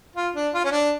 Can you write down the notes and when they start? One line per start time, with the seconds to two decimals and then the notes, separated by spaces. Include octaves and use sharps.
0.16 F4
0.35 D4
0.54 F4
0.64 C#4
0.72 D4